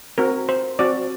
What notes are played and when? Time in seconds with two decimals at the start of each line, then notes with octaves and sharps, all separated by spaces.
0.18 C4 F#4 A#4
0.49 C5
0.79 C4 F#4 D5